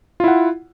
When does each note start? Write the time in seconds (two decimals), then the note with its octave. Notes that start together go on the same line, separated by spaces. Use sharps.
0.20 F4
0.24 E4
0.28 F#5